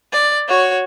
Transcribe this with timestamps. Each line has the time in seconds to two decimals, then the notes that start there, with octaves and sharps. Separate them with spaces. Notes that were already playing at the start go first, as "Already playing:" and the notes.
0.13 D5
0.48 F#4 C#5